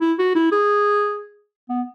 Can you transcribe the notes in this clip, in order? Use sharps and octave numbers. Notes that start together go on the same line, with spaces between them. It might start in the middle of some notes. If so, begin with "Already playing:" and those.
E4
F#4
E4
G#4
B3